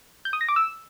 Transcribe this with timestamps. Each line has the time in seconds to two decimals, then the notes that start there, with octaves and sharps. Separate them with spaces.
0.25 G6
0.33 D#6
0.41 A#6
0.49 D6
0.56 E6